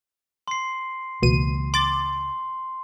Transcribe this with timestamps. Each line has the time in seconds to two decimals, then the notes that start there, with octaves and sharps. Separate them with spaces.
0.48 C6 C7
1.22 C#2 B2 E3 A#3 D#7
1.74 C6 D6 A6